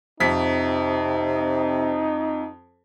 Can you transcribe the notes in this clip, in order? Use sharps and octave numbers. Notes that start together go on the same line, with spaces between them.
F2 C3 D#4 B6